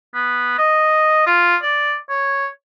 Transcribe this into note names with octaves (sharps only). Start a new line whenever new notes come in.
B3
D#5
F4
D5
C#5